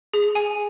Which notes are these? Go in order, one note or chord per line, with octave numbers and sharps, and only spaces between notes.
G#4
G#5